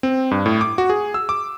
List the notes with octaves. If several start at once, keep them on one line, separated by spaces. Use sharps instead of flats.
C4
G2
A2
D6
F#4
G#4
E6
D6